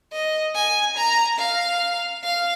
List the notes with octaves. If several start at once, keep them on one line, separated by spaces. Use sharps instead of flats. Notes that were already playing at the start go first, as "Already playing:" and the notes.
D#5
G#5
A#5
F5
F5